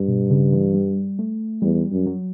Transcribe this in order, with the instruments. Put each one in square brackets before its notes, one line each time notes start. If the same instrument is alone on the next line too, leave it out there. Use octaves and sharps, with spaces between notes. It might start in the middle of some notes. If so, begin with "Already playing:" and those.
Already playing: [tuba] G2
[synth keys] B2
C#3
E3
G3
A3
[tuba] E2 [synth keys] G3
[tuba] F#2
[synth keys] F#3